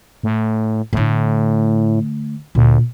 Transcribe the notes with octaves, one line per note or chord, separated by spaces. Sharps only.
A2
A2 D3 A3
D2 A#2